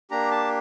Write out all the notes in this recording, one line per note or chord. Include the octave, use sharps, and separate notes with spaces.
A#3 D4 G4 A#5
A5